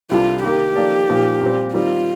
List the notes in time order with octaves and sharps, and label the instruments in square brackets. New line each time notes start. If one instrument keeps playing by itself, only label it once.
[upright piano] C2 C3 G3 D4 A4 [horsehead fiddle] F4
[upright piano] D#3 A#3 D#4 A#4 [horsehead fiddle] G4
[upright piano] F3 A#3 D#4 A4 D5
A#2 F3 A#3 D#4 A#4
A#2 G3 C4
[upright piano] D#3 G3 C4 D#4 [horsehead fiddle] F4